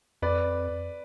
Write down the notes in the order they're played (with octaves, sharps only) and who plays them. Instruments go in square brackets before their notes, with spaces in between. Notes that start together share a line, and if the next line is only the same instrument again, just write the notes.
[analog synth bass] F2 [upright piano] B4 D5